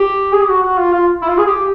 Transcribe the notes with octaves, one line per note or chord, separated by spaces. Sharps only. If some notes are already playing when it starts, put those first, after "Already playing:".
Already playing: G4
G#4
G4
F#4
F#4
F4
F4
E4
F4
G#4
G4